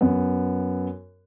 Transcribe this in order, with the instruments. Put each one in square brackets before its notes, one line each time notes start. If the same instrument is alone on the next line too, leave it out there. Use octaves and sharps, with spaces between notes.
[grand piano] F#2 B3